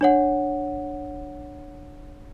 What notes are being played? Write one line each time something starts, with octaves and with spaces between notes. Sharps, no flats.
D4 C#5 F#5